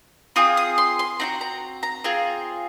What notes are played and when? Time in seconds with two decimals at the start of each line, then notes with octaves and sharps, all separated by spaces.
0.36 C4 F4 G#4 D#6
0.57 D#6
0.78 C6
0.99 C6
1.20 C4 D#4 F#4 A#5
1.41 A#5
1.83 A#5
2.04 C4 F4 G#4